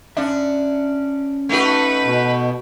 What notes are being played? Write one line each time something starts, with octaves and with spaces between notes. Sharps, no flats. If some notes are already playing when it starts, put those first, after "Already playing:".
C#4 D4 E5
A3 D#4 F#4 B4
B2